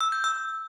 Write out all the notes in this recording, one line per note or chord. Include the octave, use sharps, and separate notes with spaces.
E6
G6
E6